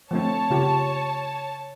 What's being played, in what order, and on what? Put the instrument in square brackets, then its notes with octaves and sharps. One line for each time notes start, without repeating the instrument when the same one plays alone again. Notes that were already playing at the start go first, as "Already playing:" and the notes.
[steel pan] F3 A3 C4 [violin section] C#5 A5
[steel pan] C#3 F4 G4